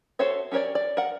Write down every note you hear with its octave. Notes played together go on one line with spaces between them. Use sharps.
F#4 A4 C5 C#5 E5
C#4 G4 A#4 C#5 D5
D5
A#4 F#5